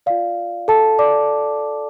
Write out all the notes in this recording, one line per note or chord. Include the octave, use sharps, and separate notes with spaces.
F4 D5 F5
A4 A5
D5 D6